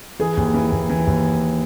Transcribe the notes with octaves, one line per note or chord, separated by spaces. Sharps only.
E3 G#4
D#2
E3
D#2
E3
D#2